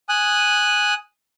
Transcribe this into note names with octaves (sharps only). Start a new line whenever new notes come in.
G#5 D#6 F#6